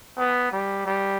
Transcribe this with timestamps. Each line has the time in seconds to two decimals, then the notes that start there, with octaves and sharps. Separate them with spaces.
0.18 B3
0.52 G3
0.86 G3